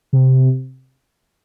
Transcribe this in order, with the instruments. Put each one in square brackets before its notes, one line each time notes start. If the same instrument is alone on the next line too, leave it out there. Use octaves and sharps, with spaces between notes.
[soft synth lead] C3